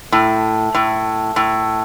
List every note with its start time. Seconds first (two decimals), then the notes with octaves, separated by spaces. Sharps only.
0.12 A2
0.75 A2
1.36 A2